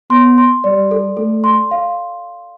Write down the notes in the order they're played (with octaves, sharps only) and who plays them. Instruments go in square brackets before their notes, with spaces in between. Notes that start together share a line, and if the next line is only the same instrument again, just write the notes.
[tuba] B3 [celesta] C6
[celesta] C6
[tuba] G3 [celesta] D5
[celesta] A4
[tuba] A3 [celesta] A4
[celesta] C6
F5